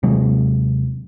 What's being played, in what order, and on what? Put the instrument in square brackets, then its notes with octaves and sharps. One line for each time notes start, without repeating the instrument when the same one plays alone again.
[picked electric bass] D#2 C3 F#3 G#3